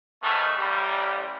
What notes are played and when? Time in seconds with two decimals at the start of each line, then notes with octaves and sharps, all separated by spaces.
0.22 D#2 G#2 D#3 A3 B3
0.57 A1 G3